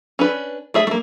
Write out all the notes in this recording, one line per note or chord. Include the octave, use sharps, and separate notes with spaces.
C#4 D4 B4
A3 G#4 E5
A3 A#3